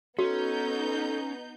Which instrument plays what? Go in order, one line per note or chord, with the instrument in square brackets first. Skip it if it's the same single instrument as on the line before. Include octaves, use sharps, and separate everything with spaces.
[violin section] B3 D#4 G6 [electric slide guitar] C#4 [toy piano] F#4 [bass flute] A4